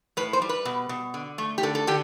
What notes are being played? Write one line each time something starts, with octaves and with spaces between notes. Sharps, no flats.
A2 B4
C5
G3
B4
B2
B2
D3
A3
G4
D3 A4
A4
D3 G4